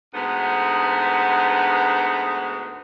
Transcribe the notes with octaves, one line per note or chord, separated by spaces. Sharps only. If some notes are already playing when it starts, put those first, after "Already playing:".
D2 G#2 B3